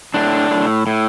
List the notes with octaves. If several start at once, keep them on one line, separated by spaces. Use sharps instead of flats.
A2 D4
A2
A2